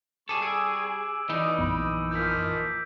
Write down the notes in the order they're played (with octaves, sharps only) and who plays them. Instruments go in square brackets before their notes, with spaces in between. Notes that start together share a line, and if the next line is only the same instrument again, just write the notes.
[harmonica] G3 C#6 [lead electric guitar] G#4 A4 [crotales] D6 E6
[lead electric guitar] G#4 [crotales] E6 D7 D#7
[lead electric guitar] E3 D#4 [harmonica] B4 D5 D#5
[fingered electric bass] A#1 F#2 B3 [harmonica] B5
[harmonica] F3 A#3 F6 [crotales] G6 B6